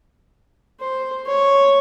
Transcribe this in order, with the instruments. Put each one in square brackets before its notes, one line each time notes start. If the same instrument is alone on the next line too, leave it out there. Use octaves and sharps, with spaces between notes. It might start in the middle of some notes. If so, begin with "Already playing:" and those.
[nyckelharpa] C5
C#5